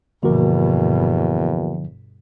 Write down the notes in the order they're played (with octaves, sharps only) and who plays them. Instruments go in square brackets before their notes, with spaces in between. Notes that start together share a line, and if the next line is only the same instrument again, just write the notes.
[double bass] G1 B2 [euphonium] E2 [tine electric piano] D3 F3 [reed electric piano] A#3 F#4 A#4